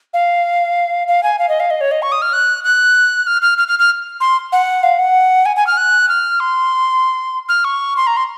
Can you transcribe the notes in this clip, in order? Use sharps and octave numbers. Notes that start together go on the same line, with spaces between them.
F5
F5
G#5
F5
D#5
F5
D#5
C#5
D#5
C#6
D#6
F6
F#6
F#6
F6
F6
F6
F6
F6
C6
F#5
F5
F#5
G#5
G#5
F6
F#6
F6
C6
F6
C#6
C6
A#5
C6